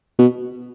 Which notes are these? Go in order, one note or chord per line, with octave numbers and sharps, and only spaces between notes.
B2